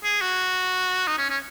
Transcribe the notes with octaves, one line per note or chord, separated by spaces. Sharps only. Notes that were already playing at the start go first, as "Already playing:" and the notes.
G#4
F#4
D#4
C#4
C#4